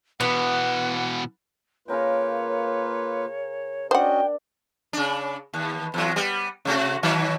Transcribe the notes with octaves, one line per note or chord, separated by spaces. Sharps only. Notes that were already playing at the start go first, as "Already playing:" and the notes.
B2 E3 B3 F#5
C#3 A#3 F4 A#4 B4 C#5 G5
C#4 D4 F#4 C5 D#5 F#5 G5
C#3 D4
D#2
E2 F#3
G3 B3
C3 A3 F#4
B2 D#3 F#3